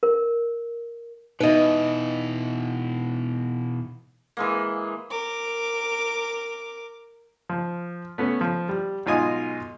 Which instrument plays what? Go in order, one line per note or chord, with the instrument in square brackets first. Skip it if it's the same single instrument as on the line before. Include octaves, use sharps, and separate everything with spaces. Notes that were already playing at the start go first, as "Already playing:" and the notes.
[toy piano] A#4
[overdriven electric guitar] B2 E3 [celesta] D#4 E5 [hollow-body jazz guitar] B4 D#5
[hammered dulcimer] E3 G#3 A#3
[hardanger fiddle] A#4 D6
[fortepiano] F3
A3 B3 C#4
F3
G3
B1 G#2 F4 D#5 G#5 D#6